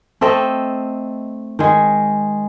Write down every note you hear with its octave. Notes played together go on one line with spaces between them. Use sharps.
A3 C4 A4 D#5
D#3 G#3